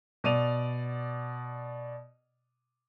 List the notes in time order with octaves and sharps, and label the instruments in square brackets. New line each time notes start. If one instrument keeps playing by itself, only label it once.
[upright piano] B2 D5 D#7 F7